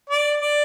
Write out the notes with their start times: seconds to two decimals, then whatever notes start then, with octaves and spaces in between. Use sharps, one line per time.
0.10 D5
0.42 D5